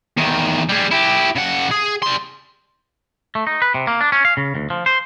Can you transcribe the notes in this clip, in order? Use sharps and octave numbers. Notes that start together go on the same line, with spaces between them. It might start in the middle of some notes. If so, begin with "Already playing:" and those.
E2 D#3
G3 G#4
E4 G4
C#3 F#5
G#4
G3 C6
A3
D#4
B4
C3
A#3
D4
C#4
F5
C#3
D2
F3
C5